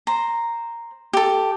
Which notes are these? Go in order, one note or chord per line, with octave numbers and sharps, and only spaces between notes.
C5 A#5
G4 A4